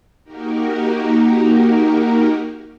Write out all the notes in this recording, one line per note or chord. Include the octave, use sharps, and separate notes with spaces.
A#3 D#4 F#4 G4 A#4